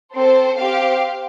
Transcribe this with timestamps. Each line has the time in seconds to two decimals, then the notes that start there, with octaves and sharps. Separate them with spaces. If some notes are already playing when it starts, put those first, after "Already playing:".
0.15 C4 A4 C5
0.59 C4 G4 F5